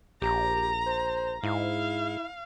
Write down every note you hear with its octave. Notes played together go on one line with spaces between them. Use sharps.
A#1 G4 A#5
C5
G#2 E4 F5